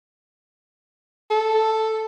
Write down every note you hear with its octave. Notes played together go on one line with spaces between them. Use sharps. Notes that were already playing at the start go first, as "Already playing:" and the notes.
A4